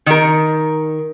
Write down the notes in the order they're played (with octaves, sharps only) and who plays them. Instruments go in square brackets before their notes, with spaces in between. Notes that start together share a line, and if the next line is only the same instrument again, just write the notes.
[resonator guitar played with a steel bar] D#3 A#4